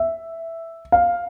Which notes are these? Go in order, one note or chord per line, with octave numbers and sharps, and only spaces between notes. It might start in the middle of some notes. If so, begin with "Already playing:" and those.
Already playing: E5
F5